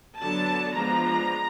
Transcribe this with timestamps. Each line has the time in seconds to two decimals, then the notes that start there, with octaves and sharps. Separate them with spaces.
0.21 D3 F#3 B3 D4 A5
0.76 F3 G#3 B3 D4 A#5